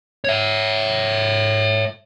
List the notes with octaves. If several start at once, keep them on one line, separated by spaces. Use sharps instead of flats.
C#5 E5